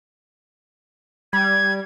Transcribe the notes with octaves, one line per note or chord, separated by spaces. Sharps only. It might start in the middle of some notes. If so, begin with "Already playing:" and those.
G3 G#6